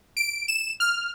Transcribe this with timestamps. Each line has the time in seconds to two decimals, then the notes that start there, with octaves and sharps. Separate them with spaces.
0.17 D7
0.48 E7
0.80 F6